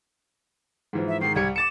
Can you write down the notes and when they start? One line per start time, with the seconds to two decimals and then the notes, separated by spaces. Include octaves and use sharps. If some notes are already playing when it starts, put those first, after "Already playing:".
0.93 G#2 E3 F3
1.08 E5
1.21 G#2 D#3 C7
1.36 C2 G3 G#6 C#7
1.56 D6 A6 C#7 E7